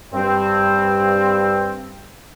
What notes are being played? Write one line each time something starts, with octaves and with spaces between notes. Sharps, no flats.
G2 C4